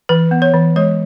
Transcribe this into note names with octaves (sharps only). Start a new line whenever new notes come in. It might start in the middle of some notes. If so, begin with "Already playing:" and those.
E3 B4
B3
C#5
E3
G#3 C#5